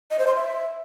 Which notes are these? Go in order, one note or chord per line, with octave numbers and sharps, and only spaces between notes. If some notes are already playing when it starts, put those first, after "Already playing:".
D#5
C5
C6
E5